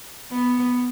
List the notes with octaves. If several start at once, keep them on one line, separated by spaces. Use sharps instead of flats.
B3